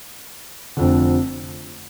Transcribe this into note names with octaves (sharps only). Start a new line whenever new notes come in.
F1 F2 D3